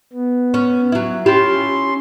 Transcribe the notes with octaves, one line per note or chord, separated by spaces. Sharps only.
B3
C#4
F#3 E4
C#4 E4 F4 G4 C6